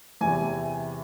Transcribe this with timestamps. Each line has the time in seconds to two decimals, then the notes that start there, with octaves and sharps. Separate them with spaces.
0.21 E2 C3 E3 G#5